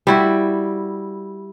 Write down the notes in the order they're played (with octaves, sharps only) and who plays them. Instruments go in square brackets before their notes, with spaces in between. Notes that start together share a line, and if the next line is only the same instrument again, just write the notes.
[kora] G3 E4 F#4